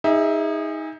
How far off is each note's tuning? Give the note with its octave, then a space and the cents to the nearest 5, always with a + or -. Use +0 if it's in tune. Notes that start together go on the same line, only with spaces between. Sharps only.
D#4 +20 G#4 -25 E5 +0